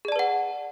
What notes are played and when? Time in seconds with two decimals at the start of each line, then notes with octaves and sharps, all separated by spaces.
0.05 G#4
0.08 D5
0.12 A5
0.16 B4
0.19 F#5